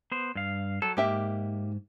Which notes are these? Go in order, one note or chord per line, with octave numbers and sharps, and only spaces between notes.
B3 C5
G2 F5
F#3 A4
G#2 A#3 G4 E5